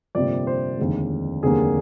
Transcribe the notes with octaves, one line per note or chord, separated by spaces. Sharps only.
G1 F2 C3 G3 A#3 D5
C5
F1 D#2 D3 G#3
F1 D#2 D3 G3 A#3 G#4